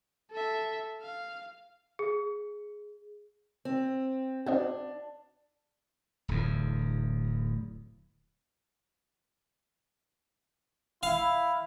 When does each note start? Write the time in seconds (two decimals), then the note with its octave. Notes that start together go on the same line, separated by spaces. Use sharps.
0.31 A4 E5
1.01 F5
1.99 G#4
3.65 C4
4.46 C4 D4 D#4 F#4
6.28 D1 E2
11.03 E4 F5